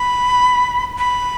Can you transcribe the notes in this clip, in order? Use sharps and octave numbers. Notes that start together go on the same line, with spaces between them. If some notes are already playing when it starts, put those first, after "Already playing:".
Already playing: B5
B5